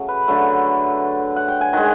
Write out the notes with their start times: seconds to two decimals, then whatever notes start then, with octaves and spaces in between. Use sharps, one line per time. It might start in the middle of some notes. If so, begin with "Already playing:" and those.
Already playing: C#3 F#3 A3
0.09 B4
0.28 D3 F#3 A3
1.36 F#5
1.48 G5
1.61 G#5
1.73 D#3 G#3 F#5